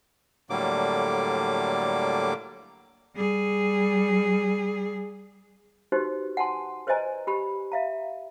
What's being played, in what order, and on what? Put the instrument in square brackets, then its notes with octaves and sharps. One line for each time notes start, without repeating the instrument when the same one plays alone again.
[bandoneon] A2 D3 F#3 G3 A#3 D6
[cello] G3 G#4
[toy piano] D#4 F#4 G4 B4 C5
F#5 G#5 A5 C6
B4 C5 D5 D#5 G#5 A#5
G4 B5
E5 F5 A#5